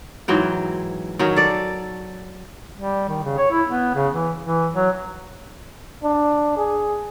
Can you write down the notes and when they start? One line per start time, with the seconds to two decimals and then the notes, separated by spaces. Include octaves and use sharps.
0.28 G#2 E3 F#3 G5
1.19 D#3 F#3 C#4
1.36 A4 D5
2.76 G3
3.08 D#3
3.23 C#3
3.38 C#5
3.51 E4
3.68 B3
3.95 C#3
4.12 E3
4.43 E3
4.73 F#3
6.04 D4
6.57 G#4